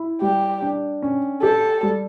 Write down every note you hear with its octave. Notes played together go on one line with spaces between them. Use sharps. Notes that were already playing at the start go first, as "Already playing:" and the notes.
Already playing: E4
G3 G4
D4
C#4
G4 A4
G3